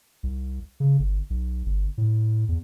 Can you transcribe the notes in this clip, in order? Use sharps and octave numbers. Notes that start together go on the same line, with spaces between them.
C2
C#3
G1
B1
G1
A2
E2